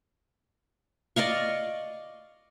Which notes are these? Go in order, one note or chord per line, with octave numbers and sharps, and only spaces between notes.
D5 D#5 F5 C#6